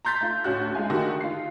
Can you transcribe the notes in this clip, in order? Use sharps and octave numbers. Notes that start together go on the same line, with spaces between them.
A#5 C6 G6 A6 B6
A3 F4
D2 A2 C#4 F#4 F#6
G#3 F4 F5 G#5
D3 D#3 A3 D#4 F#4 G4
F4 C7